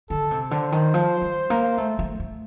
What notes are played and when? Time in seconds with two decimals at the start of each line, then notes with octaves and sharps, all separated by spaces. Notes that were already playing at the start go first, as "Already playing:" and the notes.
0.10 D3 A4
0.31 C3
0.51 D3 C5
0.72 D#3
0.94 F3
1.22 G3
1.50 A#3
1.78 A3
1.99 A3
2.20 A3